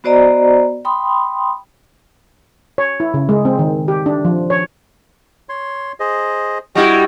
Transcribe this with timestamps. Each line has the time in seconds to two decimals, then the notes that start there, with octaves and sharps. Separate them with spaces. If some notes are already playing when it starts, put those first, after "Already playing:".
0.04 B3 F#4 C5 D5 D#5 A#5
0.85 G5 B5 C6 D#6
2.78 C#5
3.00 E4
3.14 C#3
3.29 G#3
3.45 C4
3.59 D#3
3.88 G4
4.06 D4
4.25 F3
4.50 C#5
5.49 C#5 C6
6.00 G#4 C5 D#5
6.75 G3 E4 F#4 D#5 G5